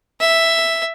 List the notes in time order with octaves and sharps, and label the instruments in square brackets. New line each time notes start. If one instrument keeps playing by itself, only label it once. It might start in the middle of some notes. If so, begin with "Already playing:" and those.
[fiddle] E5